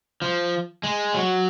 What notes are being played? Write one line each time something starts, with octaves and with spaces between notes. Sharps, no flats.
F3
G#3
F#3